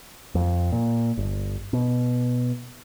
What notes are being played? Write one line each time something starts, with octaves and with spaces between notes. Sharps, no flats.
F2
A#2
G1
B2